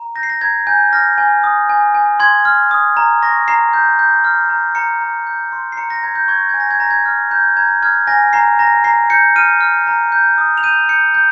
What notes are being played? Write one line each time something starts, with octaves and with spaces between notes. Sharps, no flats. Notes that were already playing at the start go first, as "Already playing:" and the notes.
Already playing: A#5
G6 A#6
C7
A#6
A#5 G#6
G#5 G6
F6 A#6
G#5
D#6
G#5
G#5
C6 G#6
F6
D#6
A#5
C#6 A#6
A#5 C7
G6
G6
F6
A#5
A#5 C#7
A#5
G6
C6
C7
A#5 C#7
A#6
A#5 G#6
G6
C#6 G#6
A#6
G#5 G#6
A#6
G#6
A#5 A#6
G#6
F6
A#5 G6
A#5 G#6
F6 G#6
G#5 A#6
A#5 C7
A#5 A#6
A#5 C7
G6 C#7
F6 D#7
F6
A#5
G6
D#6
F7
G6 D#7
G6 C#7
G6